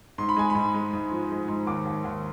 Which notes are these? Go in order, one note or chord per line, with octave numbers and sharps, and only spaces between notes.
G#2 C6
B5
G#3 G#5
G#2 B5
G#3
G#2
F3
G#3
G#2
D#2 D6
D#2
D#2